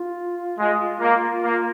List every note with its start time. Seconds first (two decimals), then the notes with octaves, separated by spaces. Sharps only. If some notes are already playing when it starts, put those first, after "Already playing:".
Already playing: F4
0.59 G#3
1.00 A#3
1.43 A#3